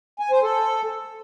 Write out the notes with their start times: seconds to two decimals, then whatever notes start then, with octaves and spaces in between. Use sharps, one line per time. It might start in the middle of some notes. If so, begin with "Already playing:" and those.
0.19 G#5
0.31 C5
0.43 A4